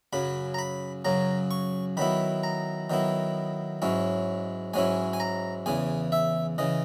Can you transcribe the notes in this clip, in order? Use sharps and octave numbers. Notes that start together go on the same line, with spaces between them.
F#2 C#3 F#3 B5
A#5
B5
F#2 C#3 F#3 A#5
C#6
D#3 F#3 B3 E4 B5
A#5
D#3 F#3 B3 E4
G#2 F#3 C#4 E4
G#2 F#3 C#4 E4 G#5
G#5
A#5
E2 C#3 E3 G#5
E5
C#3 E3 D#5